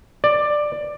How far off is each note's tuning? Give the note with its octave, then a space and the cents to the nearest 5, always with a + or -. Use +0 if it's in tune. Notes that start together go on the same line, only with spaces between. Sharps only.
D5 +10